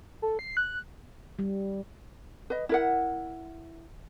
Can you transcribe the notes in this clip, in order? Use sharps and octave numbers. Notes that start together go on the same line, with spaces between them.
A4
C7
F#6
G3
B4 D#5
E4 A#4 F#5